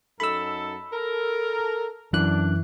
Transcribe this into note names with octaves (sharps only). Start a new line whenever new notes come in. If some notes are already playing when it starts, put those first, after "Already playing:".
F#2 D#4 A4 B5 E6
A4 A#4
F#2 E3 D4 F#6